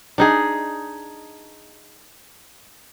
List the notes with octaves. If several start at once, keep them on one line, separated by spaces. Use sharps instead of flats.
D4 D#4 G#4